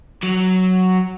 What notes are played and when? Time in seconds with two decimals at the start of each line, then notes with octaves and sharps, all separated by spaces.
0.23 F#3